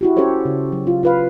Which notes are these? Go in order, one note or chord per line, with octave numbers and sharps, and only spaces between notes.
E4 F#4 G4
C#4 G4 A4 C5 C#5
C#3
F#3
F4
F4 B4 F5